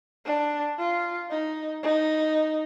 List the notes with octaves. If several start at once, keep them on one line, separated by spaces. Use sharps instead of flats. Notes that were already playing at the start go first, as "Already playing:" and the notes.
D4
F4
D#4
D#4